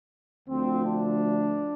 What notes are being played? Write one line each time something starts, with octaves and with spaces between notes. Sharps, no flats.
D2 D3 F3 A3 C4
D4